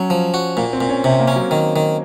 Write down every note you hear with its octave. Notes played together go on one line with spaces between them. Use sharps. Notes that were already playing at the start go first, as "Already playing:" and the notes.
Already playing: F#3 C#4
F3
F#4
A#2 A#3
C4
A#2
C#4
C3 C4
A#3
C#4
F#3
D#3
D#3